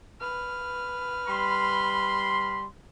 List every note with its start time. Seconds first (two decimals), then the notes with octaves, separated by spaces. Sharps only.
0.20 B4 F6
1.28 G3 B5 C6